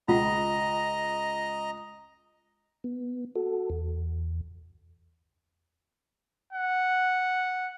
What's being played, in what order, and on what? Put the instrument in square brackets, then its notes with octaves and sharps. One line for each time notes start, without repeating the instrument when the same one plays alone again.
[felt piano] C#2 [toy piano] F4 F#5 [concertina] D#5 A#5
[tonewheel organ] B3
F#4 A4
E2
[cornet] F#5